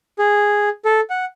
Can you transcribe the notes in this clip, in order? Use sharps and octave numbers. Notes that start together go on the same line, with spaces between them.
G#4
A4
F#5